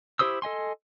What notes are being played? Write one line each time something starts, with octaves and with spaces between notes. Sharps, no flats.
E4 G4 C5 D#6 E6
A4 D#5 G#5 C6